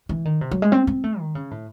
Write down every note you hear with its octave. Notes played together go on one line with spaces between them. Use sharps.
E3
D#3
C3
F#3
G#3
C4
C4
A3
D#3
C#3
A2